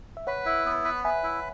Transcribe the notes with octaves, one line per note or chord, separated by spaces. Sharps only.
E5
B4 C#5 F#5
E4
B3
B4
B4 E5 G#5
E4